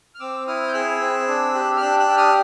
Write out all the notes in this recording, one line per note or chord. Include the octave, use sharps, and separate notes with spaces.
F6
C4 D6 E6
E4 D#6 F6
G6
G#4 E6 F#6
C4
D4
G4
F6
D4 E6 F#6
E6 F#6
G4
D#6 F6